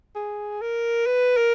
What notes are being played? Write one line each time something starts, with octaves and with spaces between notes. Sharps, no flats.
G#4
A#4
B4
A#4